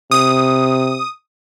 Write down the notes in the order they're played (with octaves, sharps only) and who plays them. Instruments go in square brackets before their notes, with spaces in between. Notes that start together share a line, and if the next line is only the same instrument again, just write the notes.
[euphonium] C3 [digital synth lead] D#6